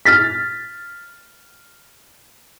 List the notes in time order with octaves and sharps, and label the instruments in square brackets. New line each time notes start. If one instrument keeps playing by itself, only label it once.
[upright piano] F6 A6 B6